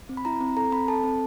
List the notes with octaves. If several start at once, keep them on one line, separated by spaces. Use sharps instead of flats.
C4
B5
E4 A#5
C4
A4 A#5
C4 B5
A4 A5
C4